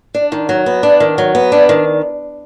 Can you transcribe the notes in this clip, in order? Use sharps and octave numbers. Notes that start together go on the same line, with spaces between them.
D4
D#3
F#3
B3
D4
D#3
F#3
B3
D4
D#3